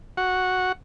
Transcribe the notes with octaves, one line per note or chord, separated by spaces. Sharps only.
F#4 F#5